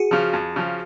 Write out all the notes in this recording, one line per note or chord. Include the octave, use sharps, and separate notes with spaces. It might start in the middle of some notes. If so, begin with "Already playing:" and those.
Already playing: F#4 G#4
C#3 F3
F2
C#3 F3